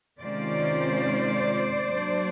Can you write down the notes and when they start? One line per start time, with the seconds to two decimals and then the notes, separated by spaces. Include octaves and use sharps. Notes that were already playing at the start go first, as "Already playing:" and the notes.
0.19 C3 D#3 G#3 C#4 F4 C5 D5
1.88 F#3 A#3 D4